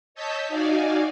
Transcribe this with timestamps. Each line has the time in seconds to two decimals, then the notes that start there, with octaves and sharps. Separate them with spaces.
0.15 C#5 D#5 A5 E6 G6 B6
0.48 D#4 F#4 D5 F5 G#5